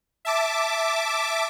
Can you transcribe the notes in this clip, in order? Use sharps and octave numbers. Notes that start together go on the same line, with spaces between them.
E5 A5 D6